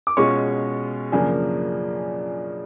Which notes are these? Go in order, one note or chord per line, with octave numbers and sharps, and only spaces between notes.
D6
B2 G#3 C#4 F4 C#6
F#2 C#3 F3 A#3 D4 G#5